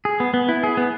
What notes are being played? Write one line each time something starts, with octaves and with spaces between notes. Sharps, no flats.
G#4
B3
B3
E4
G#4
B3